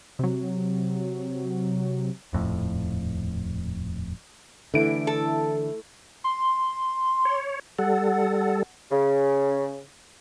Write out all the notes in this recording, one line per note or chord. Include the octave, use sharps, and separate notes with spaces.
C3 F#3
D#1 F2 A2
D3 E3 A3 E4 D7
A4
C6
C#5
G3 A4 F#5
C#3